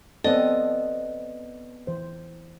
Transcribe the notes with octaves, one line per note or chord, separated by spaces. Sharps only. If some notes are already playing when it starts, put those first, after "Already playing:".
B3 C4 A4 D5 D#5
E3 C5